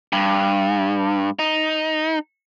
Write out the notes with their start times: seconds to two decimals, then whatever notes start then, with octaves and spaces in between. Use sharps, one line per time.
0.13 G2
1.39 D#4